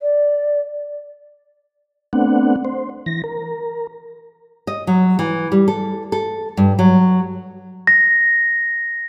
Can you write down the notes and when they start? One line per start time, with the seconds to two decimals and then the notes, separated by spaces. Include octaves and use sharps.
0.01 D5
2.13 A3 B3 C4 D4 F#5
2.65 C5
3.06 E3 A#6
3.24 A#4
4.67 D#5
4.87 F#3
5.19 E3
5.52 G3
5.68 A4
6.12 A4
6.57 G2
6.79 F#3
7.87 A#6